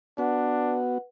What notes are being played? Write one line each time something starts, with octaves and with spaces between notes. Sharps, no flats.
B3 D4 F#4 B4 F#5